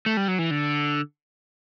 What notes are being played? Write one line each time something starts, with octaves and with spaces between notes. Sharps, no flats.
A3
G3
F#3
E3
D3